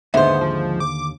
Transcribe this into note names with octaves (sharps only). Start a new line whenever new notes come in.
D#2 G#2 D3 B3 C5 E5
F3
D6